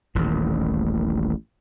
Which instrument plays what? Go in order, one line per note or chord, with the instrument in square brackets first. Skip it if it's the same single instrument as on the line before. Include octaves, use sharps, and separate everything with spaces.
[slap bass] D#1 A1 D#2 A2